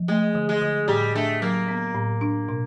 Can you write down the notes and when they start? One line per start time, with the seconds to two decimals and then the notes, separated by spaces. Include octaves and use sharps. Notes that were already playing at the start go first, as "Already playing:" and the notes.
Already playing: F3
0.08 G#3 A3
0.35 D3
0.49 G#3
0.61 D3
0.88 A2 G3
1.15 A3 D4
1.42 F#3 A#3
1.68 B3
1.95 A2
2.21 D4
2.49 B2